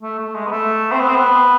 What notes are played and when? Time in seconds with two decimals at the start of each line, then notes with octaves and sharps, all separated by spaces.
0.02 A3
0.19 A3
0.35 G#3
0.47 B3
0.51 A3
0.92 C4
1.00 B3
1.08 C4
1.16 B3